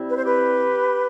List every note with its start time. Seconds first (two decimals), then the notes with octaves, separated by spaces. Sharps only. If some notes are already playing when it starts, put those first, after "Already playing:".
Already playing: C3 G3 C4 E4
0.10 B4
0.18 C5
0.26 G4 B4